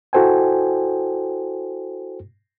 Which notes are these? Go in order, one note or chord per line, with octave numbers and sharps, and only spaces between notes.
E4 F#4 A4 C5 G5 G#5